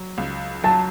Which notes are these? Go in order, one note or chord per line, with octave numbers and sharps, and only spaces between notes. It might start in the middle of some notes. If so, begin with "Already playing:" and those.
Already playing: F#3
C#2
F#3 A5